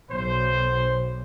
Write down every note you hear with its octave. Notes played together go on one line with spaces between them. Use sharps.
B1 C5